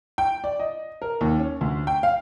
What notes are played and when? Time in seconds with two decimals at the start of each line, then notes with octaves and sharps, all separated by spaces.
0.18 G5
0.44 D5
0.60 D#5
1.02 A#4
1.21 D#2
1.40 C#4
1.61 D2
1.87 G5
2.03 F5